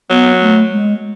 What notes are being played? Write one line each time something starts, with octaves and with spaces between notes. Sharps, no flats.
F#3 B3
A3
G#3